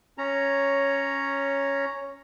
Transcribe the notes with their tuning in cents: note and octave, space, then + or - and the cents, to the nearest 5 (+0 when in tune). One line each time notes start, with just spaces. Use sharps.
C#4 +0 C#5 +0 A#5 +0